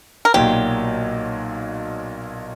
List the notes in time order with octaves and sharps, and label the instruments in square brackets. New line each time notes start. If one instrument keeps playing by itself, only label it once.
[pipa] A#4
[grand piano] B1 A#2 F#3 [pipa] G4